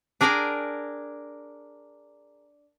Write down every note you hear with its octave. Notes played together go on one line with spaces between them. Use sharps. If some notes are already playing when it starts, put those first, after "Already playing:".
D4 G#4 A#4 D5 G5 G#5